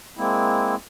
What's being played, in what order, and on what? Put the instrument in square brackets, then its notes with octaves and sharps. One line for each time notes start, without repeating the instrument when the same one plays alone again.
[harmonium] G#3 A#3 C4 E4